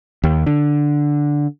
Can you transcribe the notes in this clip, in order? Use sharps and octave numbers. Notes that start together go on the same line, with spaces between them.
D#2
D3